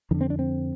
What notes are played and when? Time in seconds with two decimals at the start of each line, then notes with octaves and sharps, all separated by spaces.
0.11 F2 D3 D#3
0.21 C4
0.30 D4
0.39 C4